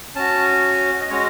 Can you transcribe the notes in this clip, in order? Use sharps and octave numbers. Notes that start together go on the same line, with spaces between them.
C#4 F#4 A5
D#5
G#3 C#4 F#4 C#5